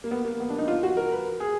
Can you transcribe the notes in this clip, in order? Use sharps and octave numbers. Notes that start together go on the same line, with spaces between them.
A#3
B3
A#3
B3
D4
D#4
F4
F#4
A#4
B4
G#4